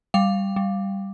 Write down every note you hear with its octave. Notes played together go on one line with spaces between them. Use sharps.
G3 F5
G3